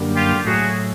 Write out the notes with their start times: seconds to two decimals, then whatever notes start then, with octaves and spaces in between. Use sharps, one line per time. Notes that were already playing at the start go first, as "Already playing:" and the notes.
Already playing: F#2 D3 G3 A#3
0.15 F4 G4
0.45 A2 F#3 A3 F#4 G#4